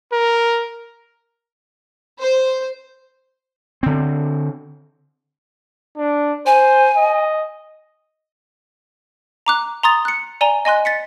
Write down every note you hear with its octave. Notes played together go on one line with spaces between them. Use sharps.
A#4
C5
D3 C4
D4
C5 G#5
D#5
A#5 D6 F#6
A#5 C6 D#6 A6
F#6 C#7
D5 G#5 A#5 G7
D#5 G#5 C6 F#6
A6 B6 C#7